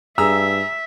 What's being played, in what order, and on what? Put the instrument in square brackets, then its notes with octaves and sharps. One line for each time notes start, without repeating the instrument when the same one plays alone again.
[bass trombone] G2 [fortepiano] G#4 [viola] E5 [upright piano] A#5 E6